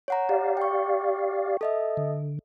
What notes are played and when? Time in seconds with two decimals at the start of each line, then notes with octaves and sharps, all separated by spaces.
0.08 C#5 F#5 A#5
0.29 G4 D5 F5
0.57 G5 C#6
1.61 A4 D#5 E5
1.97 D3